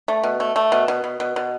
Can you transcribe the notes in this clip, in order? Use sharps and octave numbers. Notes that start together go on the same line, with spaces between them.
A3
B2
A3
A3
B2
B2
B2
B2
B2